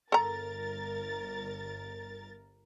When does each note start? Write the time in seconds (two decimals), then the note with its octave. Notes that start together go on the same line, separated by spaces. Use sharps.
0.12 G1 A4 A#4 A#5 A6